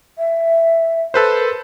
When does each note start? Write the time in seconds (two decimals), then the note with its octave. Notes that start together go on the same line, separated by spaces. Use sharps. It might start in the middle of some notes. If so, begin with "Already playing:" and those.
0.18 E5
1.14 A4 B4 C5
1.38 A#4